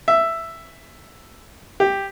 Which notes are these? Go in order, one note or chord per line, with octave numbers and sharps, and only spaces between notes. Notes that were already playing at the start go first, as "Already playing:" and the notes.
E5
G4